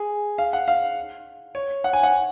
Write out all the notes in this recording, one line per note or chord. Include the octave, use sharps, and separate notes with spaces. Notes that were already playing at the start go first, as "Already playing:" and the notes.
Already playing: G#4
F5
F#5
F5
C#5
F#5
G#5
F#5